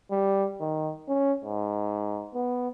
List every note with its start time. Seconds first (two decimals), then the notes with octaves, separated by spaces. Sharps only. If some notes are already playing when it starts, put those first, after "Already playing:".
0.11 G3
0.60 D#3
1.09 C#4
1.45 G#2
2.34 B3